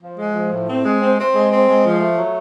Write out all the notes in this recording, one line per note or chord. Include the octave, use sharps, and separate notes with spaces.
F3
G#3
F3
A2
C4
G#3
C4
C4
G#3
C4
G#3
F3
A3
F#3